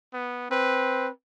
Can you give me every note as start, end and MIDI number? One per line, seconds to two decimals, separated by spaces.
0.13 0.49 59
0.51 1.08 60
0.51 1.11 71